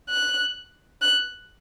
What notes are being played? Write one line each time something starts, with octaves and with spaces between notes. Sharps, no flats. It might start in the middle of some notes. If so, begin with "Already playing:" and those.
F#6
F#6